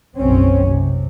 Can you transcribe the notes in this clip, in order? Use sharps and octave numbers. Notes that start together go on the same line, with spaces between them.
F#1 B1 C4 C#4
C3